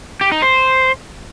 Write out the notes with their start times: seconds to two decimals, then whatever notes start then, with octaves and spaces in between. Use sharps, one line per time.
0.21 G4
0.32 D#4
0.42 C5